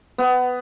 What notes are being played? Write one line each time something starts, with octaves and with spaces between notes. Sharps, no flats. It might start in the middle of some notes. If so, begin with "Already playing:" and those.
B3